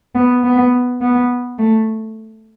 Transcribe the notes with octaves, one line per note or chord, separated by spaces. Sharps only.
B3
B3
B3
A3